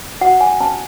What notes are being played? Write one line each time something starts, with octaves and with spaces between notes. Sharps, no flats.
F#4 F#5
G#5
C#4 A5